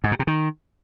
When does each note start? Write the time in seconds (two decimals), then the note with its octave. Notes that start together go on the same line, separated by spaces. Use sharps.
0.04 G#2
0.12 A#2
0.19 C3
0.27 D#3